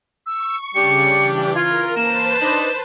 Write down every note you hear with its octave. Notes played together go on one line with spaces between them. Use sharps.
C#6 E6
C#3 G3 D4 G4 C#7
E3
F4 A#4 G#6
A#3 B4 C5 A5 E7
D4 D#4